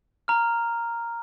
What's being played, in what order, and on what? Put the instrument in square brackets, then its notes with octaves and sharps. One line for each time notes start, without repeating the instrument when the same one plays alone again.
[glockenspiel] A#5 F6